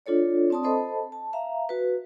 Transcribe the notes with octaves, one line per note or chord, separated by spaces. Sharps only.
D4 F4 A4 C#5 D5
C4 D5 A5 C6 D#6
A4 C5 D#5 A5 B5
A5
E5 F5 A#5
F#4 B4